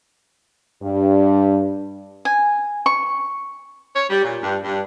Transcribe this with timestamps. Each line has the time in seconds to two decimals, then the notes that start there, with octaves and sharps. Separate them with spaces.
0.82 G2
2.25 G#5
2.86 C#6
3.96 C#5
4.10 G3
4.24 A#2
4.43 G2
4.64 G2